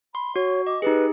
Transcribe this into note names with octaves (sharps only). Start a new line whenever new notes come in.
B5 C6
F#4 C#5
D#5 D6
D#4 G4 G#4 B4